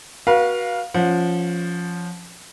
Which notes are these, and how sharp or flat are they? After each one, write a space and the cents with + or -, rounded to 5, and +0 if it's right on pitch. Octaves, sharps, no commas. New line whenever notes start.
F#4 +0 B4 -40 F5 +0
F3 +0 C#4 +0 F#5 -35